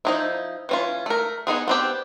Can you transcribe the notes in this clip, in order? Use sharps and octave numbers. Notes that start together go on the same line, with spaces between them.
F3 D#4 E4
E3 C#4 F4
A3 A#4
B3 D#4 F4 G#4
B3 C4 G4